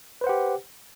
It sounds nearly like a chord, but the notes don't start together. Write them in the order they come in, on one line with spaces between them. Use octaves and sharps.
B4 C5 F#5 G4